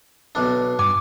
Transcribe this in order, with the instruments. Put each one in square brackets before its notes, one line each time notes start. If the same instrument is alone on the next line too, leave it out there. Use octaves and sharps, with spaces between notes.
[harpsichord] B1 D4
[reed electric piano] G2 D6 [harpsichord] G#5